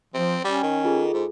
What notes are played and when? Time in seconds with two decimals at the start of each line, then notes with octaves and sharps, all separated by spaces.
0.14 F3 C4
0.44 G3 C#4 G5
0.63 D#3
0.85 F4 G#4 A4
1.13 G#2